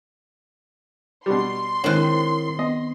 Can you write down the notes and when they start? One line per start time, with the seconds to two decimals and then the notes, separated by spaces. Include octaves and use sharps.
1.26 B2 G3 C6
1.84 G#2 D#3 C4 E4 A#4 C#5 F#6
2.59 B3 D#5